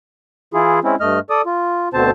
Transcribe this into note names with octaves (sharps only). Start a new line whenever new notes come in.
E3 E4 F4 G#4
G#3 C4 C#4 E4
G2 A3 D#5 F6
A4 D5 D#6
F4
D2 B2 D3 C4 C5 A5